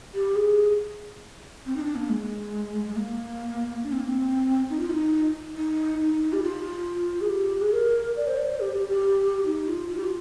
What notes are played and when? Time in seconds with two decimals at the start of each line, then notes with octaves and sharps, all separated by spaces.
0.14 G4
0.36 G#4
1.66 C4
1.76 D#4
1.80 D4
1.96 A#3
2.09 G#3
2.88 G#3
2.96 A#3
3.83 D4
3.92 C4
4.00 A#3
4.08 C4
4.70 D#4
4.79 F4
4.90 D#4
5.56 D#4
6.00 D#4
6.33 G4
6.43 F4
7.21 G#4
7.29 G4
7.61 G#4
7.73 A#4
8.16 D5
8.27 C5
8.38 D5
8.48 C5
8.60 G4
8.74 G4
8.89 G4
9.46 D#4
9.68 F4
9.89 F4
9.97 G4
10.04 F4